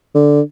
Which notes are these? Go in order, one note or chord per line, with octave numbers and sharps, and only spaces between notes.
D3